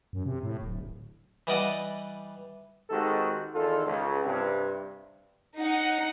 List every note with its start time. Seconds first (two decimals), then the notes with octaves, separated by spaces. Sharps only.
0.13 F#2
0.25 C3
0.43 A2
0.62 D1
1.47 E3 G3 D5 D#5 F#5
2.90 D#3 G#3 C4 F#4 G4 A4
3.54 E2 D#3 F4 A4
3.87 C#2
4.25 G2 C3
5.57 D#4 F#5